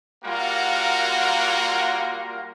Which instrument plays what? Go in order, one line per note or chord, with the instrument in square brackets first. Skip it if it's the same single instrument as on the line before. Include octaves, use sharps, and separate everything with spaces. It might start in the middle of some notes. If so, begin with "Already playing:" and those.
[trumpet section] G3 A#3 F4 F#4 A#4 F#5